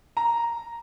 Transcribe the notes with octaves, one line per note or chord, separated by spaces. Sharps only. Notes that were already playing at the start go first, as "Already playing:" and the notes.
A#5